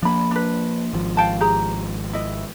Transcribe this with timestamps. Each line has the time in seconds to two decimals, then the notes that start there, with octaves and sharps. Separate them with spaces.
0.02 F3 A#3 D4 B5
0.31 D4 B4
0.93 G#1 F3
1.17 F5 G5 A5
1.41 G4 G#4 A#5
2.13 E4 D#5